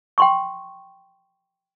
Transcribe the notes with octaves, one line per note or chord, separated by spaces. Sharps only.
G5 C6 C#6